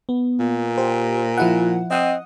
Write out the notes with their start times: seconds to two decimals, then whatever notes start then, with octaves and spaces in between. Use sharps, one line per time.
0.09 B3
0.40 A#2
0.78 G4 C5
1.37 F3 E4 F#5
1.91 C4 D#5 F#5 D#6